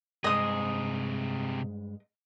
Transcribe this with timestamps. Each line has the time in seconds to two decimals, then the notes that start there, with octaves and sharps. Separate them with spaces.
0.24 G2 C3 G#3 G#4 D#5 D#6